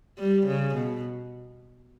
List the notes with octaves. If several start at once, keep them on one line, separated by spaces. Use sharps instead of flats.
G3
C#3
B2